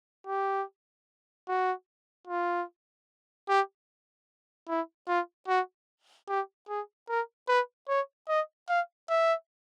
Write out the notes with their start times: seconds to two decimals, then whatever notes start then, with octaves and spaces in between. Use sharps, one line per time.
0.27 G4
1.48 F#4
2.27 F4
3.49 G4
4.69 E4
5.08 F4
5.48 F#4
6.28 G4
6.68 G#4
7.09 A#4
7.48 B4
7.88 C#5
8.28 D#5
8.68 F5
9.09 E5